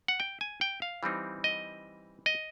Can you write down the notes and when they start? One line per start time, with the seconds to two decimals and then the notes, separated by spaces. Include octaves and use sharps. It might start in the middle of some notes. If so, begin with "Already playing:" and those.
0.08 F#5
0.20 G5
0.41 G#5
0.61 G5
0.82 F5
1.03 E3 G3 C4 D#4
1.44 D#5
2.26 D#5